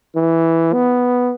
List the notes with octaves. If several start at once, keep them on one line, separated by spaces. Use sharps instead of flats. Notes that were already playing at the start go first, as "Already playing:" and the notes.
E3
B3